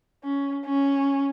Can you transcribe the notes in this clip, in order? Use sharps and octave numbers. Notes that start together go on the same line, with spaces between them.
C#4
C#4